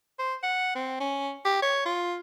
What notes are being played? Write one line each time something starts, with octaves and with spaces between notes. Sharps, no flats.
C5
F#5
C4
C#4
G4
C#5
F4